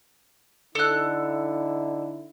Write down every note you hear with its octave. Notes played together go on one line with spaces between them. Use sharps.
D3 D#4 E4 A4 F#6